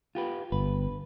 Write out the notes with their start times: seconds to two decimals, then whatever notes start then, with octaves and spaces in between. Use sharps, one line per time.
0.15 F4 G4 B4
0.52 G1 B4